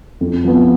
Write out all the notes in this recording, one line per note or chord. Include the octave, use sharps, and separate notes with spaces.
F2
F3 B3